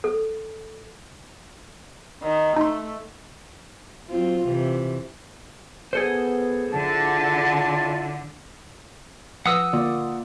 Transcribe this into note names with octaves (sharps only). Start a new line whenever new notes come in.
A4
D#3
A3 D#4 C6
F#3 C4 F4
C3 E3
B3 G#4 A4 C5
D3 E4 F4 A5
F3 B4 F#5 D#6 E6 A#6
D3 A#3 F4 D5 C6